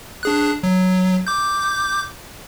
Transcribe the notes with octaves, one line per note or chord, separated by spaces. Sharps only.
D4 G#4 F#6
F#3
D6 G6